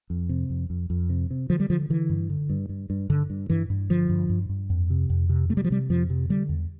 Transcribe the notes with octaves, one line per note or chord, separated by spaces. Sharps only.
F2
C3
F2
F2
F2
C3
C3
D3 F3
G3
D3 F3
D3 E3
G2
D3
G2
G2
G2
G2 D3
G2
G2 E3
G2
D3 F3
G2
G2
G2
F2
C3
F2
C3
C3 A3
G3
F3
C3 G3
F2 F3
C3
D3 G3
E2